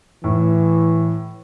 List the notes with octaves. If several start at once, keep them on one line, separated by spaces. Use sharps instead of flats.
A2 E3